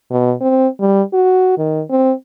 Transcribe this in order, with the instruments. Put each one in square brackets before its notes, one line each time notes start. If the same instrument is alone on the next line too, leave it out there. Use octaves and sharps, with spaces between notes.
[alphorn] B2
C4
G3
F#4
D#3
C4